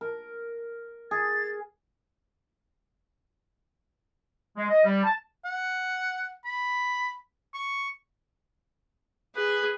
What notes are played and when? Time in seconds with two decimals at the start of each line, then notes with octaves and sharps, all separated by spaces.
0.01 A#4
1.11 G#4 A6
4.57 G#3
4.69 D#5
4.85 G3
5.03 A5
5.45 F#5
6.45 B5
7.54 C#6
9.36 G#4 B4